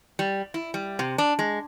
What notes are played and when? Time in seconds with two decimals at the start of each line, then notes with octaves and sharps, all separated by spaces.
0.19 G3
0.54 E4
0.74 G3
0.99 C3
1.18 D4
1.39 G#3